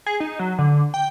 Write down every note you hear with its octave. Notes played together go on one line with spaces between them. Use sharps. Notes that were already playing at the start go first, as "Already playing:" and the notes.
G#4
D#4
F#3
D3
G5